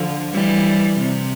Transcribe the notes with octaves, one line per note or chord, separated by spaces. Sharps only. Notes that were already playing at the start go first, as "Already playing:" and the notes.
Already playing: D3 F3
E3 G3
C3